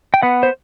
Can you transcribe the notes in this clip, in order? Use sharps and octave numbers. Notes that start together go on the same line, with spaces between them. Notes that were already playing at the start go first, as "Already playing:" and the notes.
G5
B3 F#5
C5